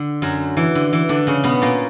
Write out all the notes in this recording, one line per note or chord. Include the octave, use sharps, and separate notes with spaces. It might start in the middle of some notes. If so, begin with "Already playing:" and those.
Already playing: D3
F#2 F#3
E3
D3
E3
D3 D4
C#3 C#4
B2 B3
A#2 A#3